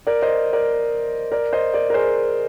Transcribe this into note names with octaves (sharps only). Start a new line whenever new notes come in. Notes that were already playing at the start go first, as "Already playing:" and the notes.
A#4 D5
C5 D#5
A#4 D5
A#4 D5
C5 D#5
A#4 D5
A#4
G#4 C5